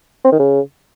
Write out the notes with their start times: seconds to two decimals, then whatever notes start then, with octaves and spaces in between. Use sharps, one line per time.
0.24 C4
0.32 D#3
0.39 C#3